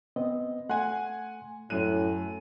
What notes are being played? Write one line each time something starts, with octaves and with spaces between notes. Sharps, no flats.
B3 C4 D#5
A3 F#5 G#5 C6 F#6
F#2 A2 F#6 D#7